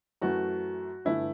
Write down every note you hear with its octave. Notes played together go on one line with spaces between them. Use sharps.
F#2 E3 A3 F#4
G1 G2 E3 A3 E4